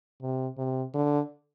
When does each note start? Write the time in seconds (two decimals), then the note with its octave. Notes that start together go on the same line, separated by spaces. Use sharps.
0.21 C3
0.58 C3
0.94 D3